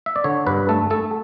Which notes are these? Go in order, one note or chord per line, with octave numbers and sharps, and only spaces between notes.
E5
D5
D3 C#5
G2 B4
A3 A4
A3 A4